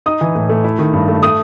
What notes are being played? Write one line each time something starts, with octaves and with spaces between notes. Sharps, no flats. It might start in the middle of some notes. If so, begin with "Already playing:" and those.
D#4 D#6
E3
A2
A3
E4
D#3
G2
A3
A3 D#6